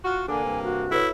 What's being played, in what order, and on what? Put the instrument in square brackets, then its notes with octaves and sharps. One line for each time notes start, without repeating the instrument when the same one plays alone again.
[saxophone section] F4 F#4
[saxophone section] D3 D4 [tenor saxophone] A#3 [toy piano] A4 [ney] G#5
[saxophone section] G2 C3
[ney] F#4
[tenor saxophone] E4 [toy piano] A4 B4 C#5